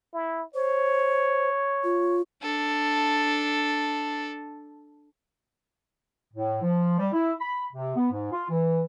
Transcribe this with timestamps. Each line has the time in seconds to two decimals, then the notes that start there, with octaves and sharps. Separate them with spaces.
0.14 E4
0.54 C5 C#5
1.84 F4
2.42 D4 A4
6.34 A2
6.63 F3
6.99 G3
7.13 E4
7.41 B5
7.74 C3
7.96 B3
8.12 G#2
8.33 F4
8.50 E3